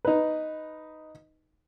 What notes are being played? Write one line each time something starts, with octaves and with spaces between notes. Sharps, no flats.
D#4 B4